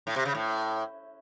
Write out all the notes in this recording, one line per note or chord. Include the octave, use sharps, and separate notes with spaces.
A2
C3
C#3
A2